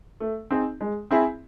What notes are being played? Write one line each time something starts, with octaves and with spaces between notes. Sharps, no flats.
A3
C4 D#4 G#4
G#3
C4 E4 G#4